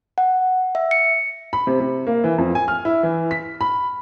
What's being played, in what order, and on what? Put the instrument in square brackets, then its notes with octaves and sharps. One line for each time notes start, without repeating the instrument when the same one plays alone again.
[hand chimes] F#5
E5
C#7
[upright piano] B5
C3
C3
A#3
E3
F2
G#5
F6
E4
E3
B6
B5